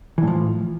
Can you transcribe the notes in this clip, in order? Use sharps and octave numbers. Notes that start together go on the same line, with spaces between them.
A2 E3 F3